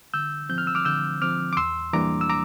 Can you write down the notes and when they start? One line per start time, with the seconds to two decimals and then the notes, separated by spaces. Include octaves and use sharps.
0.14 D3 E6 G6
0.49 F3 C4 G6
0.58 F6
0.67 E6
0.75 D6 F6
0.85 D3 E6 G6
1.22 F3 C4 D6 F6
1.53 D6
1.57 E2 C6 E6
1.93 E3 G3 A#3 D4 A#5 D6
2.21 E6
2.29 A#5 D6